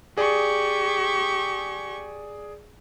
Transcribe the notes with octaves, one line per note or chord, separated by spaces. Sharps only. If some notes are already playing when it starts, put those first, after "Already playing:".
G4 G#4 D5 C#6